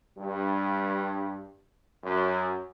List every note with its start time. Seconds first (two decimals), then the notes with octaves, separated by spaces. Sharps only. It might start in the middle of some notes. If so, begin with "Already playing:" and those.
0.17 G2
2.04 F#2